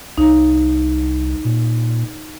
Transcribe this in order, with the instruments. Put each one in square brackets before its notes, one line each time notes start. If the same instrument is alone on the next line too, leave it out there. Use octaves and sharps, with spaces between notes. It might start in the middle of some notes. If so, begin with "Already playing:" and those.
[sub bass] C2 [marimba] D#4
[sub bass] A#2